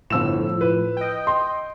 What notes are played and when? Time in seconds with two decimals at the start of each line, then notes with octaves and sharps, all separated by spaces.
0.10 G1 A2 F3 E6 E7
0.61 B4
0.97 D#5 G5
1.27 C6